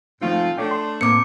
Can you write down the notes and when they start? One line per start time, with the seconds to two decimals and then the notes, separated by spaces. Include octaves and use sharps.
0.21 G#2 F3 A3 C4 D#4 F4
0.57 A3 D4 C#5 D5 G5
0.71 C6
1.01 A2 A#3 C4 D6 C#7